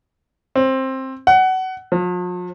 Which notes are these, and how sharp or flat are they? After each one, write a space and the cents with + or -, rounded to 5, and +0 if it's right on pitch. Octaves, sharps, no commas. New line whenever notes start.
C4 +15
F#5 +20
F3 +45